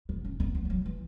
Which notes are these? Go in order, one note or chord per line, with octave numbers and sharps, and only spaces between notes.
B3
C#4
B3
B3
G#3
F#3
E3